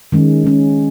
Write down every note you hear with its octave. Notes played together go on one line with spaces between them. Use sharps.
D#3 G#3 C#4
D#3 G#3 C#4